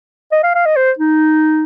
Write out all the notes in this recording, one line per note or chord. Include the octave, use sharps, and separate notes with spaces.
D#5
F5
F5
D#5
C5
D#4